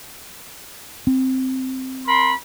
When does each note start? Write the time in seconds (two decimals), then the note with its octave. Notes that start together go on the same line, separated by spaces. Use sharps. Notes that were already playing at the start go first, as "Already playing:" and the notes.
1.07 C4
2.06 A#4 B5 C6